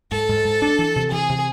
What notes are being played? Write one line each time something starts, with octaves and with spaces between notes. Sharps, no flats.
G#2 A4
G#2
G#2
D4
E3
C3
E3 G#4
C3